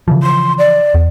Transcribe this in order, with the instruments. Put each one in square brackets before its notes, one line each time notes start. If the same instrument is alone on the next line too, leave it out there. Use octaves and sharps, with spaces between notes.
[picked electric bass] C#3 E3 F3
[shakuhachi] C6
D5
[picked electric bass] E2